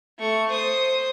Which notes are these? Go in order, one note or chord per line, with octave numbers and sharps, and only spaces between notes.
A3 C#6
C5 D#6